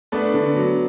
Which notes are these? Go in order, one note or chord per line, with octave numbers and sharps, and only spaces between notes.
A3 B3 D4
D3
F#3